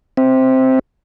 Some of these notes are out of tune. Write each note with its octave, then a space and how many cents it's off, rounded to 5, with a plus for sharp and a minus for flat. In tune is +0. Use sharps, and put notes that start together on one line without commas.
C4 +0 E5 -20